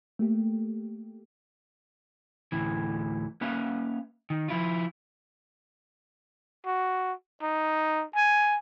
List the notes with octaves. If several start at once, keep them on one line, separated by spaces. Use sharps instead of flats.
A3 A#3 G4
D2 A2 E3
A#3 C#4 B4 E5 F5
D#3
F3 E4 F4
F#4
D#4
G#5